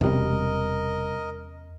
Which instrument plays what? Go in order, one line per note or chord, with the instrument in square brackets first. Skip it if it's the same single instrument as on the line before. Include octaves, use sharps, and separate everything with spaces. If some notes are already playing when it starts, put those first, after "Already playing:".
[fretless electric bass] E1 [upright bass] E2 C#4 [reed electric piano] C3 G3 [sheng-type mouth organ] A#4 D#5